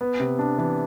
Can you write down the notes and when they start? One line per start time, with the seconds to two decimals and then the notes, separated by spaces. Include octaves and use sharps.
0.01 B3
0.20 C3
0.39 D4
0.58 E3